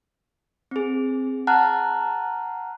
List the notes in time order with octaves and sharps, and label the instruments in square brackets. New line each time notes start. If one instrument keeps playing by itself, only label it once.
[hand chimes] C4 G#4
F#5 A5 A#5 F6 F#6